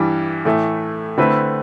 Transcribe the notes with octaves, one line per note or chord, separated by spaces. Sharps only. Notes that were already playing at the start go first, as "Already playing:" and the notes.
Already playing: G2 E3 G3
A2 E3 A3
D3 A3 C4 E4 B4